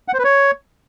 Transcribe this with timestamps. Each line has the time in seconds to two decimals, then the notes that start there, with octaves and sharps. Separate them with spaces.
0.08 F#5
0.14 C5
0.19 B4
0.24 C#5